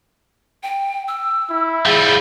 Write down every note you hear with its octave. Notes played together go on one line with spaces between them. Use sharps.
G5
E6
E4
F3 G3 G#4